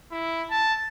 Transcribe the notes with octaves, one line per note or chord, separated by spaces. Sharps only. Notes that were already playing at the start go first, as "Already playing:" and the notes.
E4
A5